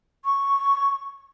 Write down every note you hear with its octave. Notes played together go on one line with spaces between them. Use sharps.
C#6